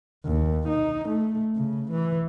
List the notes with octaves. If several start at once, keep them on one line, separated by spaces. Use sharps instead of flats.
D#2
D#4
A3
C#3
E3